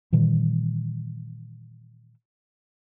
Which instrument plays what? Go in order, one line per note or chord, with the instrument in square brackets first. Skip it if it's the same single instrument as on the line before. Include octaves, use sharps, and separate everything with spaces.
[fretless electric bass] A#2 D#3 E3 G3